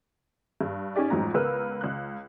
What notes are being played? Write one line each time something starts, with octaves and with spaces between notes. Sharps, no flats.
G2
C#4 D#4 G4 D5
A1 F2 G#2 F#3 A#5
C#2 B3 A#4 B4 E6
C#2 F#6